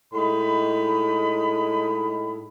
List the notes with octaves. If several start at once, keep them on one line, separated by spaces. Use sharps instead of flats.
A2 G#3 D#4 B5